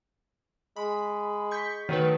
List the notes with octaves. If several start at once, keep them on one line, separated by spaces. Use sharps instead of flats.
G#3 B5
C#6 G6 B6
D#3 F#3 A3 B4